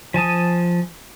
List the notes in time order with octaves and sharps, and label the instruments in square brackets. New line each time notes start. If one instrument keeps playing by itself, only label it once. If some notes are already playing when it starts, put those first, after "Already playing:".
[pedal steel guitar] F3 G#5 A5 D#6